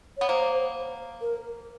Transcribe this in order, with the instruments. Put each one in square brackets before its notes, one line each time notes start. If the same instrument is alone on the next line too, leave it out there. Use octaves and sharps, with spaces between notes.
[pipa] B3 [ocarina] C#5
[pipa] A#3 [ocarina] C5
[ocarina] A#4